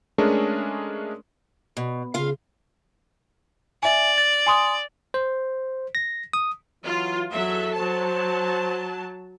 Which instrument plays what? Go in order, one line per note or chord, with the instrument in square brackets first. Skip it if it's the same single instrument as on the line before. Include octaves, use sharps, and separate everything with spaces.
[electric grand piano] G#3 A3 C#4 D4 G#4 A#4
[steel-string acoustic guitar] B2
[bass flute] C#3 [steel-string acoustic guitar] F4 F5
[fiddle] D5 [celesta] E5 G#5
[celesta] A6
G#5 C6 D#6
[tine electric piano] C5
A#6
D#6
[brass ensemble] E3 F#3 [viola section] F4
[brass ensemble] E2 [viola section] F#3 A4 E5
[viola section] F#3 A5 [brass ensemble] C5